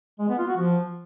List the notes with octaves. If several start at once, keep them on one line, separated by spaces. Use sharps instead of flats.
G#3
B3
F4
F#4
F3